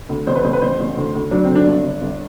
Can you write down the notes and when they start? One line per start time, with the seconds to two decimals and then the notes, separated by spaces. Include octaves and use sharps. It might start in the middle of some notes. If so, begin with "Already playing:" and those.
0.09 D2
0.27 A1 C5
0.36 B4
0.45 A1 C5
0.53 B4
0.62 A1 C5
0.80 A1
0.97 D2
1.14 D2
1.31 F#3 D4
1.44 C4
1.49 D3
1.55 D4
1.67 G1 D4
1.84 G1
2.01 G1